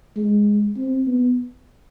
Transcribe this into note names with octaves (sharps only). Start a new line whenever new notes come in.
G#3
C4
B3